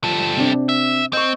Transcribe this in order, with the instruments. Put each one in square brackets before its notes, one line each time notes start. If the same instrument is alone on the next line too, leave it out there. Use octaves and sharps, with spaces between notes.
[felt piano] F3 [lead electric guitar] G3 A4
[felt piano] C3 C4 D4
[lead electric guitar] E5
[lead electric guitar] C4 [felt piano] D#5 C#6